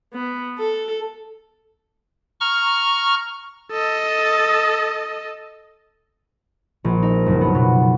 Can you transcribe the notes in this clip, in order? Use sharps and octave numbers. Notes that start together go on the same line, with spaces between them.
B3
A4
A#5 C#6 F6
A4 D#5
A#1
D#4
F#1
B3
B2